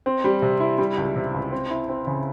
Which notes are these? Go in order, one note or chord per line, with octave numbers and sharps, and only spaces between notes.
C4
G3
C3
E4
G3
C#2
C3
C#2
C4
E4
C4
C#3